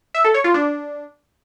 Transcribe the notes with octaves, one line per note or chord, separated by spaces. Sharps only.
E5
A4
C#5
F4
D4